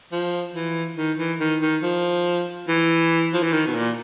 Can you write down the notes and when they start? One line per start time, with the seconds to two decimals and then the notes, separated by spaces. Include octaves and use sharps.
0.12 F3
0.55 E3
0.97 D#3
1.18 E3
1.40 D#3
1.62 D#3
1.83 F3
2.68 E3
3.34 F3
3.43 E3
3.52 D#3
3.67 B2
3.75 A#2